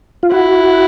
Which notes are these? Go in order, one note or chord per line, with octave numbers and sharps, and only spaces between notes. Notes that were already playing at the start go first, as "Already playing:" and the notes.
F4
E4 F#4